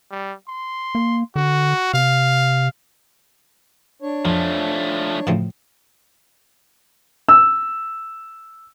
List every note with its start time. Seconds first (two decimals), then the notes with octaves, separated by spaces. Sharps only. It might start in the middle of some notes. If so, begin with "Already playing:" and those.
0.11 G3
0.48 C6
0.95 A#3
1.36 D3 F#4
1.94 C3 F5
4.02 D4 C#5
4.25 F2 F3 A3
5.27 A2 C#3 F3
7.29 E6